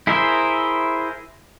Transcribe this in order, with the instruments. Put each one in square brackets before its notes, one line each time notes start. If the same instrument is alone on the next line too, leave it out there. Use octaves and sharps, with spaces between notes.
[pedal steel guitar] E4 G#4 A#4 C5 E5